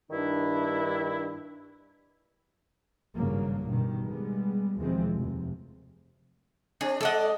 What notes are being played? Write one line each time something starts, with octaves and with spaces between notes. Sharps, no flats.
G2 D#3 D4 E4
G#1 G2 C#3 F#3 A#3
A1 G2 B2 D#3
G3 G#3 B3
D#2 B2 E3 F3 G#3 C4
F1 C3
C4 D4 G#4
G#3 A4 D5 D#5 F#5